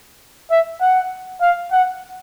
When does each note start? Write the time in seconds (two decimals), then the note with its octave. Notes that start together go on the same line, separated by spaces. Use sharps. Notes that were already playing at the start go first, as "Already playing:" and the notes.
0.50 E5
0.80 F#5
1.41 F5
1.71 F#5